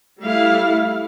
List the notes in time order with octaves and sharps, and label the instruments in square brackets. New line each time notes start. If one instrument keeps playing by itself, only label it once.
[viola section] G3 A3 E4 F5